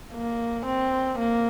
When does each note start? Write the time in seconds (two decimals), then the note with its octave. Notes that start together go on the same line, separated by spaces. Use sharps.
0.13 A#3
0.66 C4
1.18 A#3